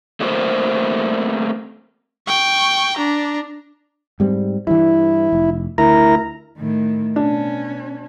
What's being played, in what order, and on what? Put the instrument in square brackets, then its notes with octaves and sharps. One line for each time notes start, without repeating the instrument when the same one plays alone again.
[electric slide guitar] A3 A#3 C4 F#4 A#4 C5
[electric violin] G5 C#6
D4 A#5
[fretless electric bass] G#2 G3 C4
[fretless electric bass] G2 E3 [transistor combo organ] E4
[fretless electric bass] F1
[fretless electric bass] D2 [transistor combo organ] E4 A#4 A#5
[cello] A2 D#3
[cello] B2 C#4 [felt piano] D4